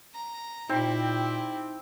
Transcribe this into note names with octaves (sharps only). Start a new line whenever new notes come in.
A#5
A#2 C4 D#4 E4 G4